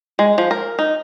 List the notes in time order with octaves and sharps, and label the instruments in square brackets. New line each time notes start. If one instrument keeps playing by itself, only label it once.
[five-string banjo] G#3
F3
A#4
D#4